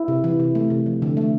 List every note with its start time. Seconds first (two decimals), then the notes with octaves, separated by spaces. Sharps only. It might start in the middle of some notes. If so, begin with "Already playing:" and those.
Already playing: E4
0.08 C3
0.24 E3
0.40 C3
0.55 A3
0.70 C3
0.86 F3
1.02 D3
1.17 A3